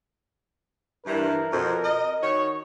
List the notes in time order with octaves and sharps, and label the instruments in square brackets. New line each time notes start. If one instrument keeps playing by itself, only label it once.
[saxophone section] G2 E3 [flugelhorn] A#4
[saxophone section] F2 B2
D#5
D#3 F#4 C#5